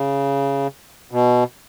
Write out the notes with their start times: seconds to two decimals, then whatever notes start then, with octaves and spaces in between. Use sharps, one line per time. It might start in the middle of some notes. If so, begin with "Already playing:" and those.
Already playing: C#3
1.11 B2